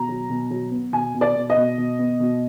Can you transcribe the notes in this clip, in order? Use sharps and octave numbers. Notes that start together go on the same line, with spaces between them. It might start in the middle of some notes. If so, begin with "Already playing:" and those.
Already playing: B2 A#5
F#3
B2
F#3
B3
B2 G#5
B2
D5
B2
D#5
B2
B2
B3
B2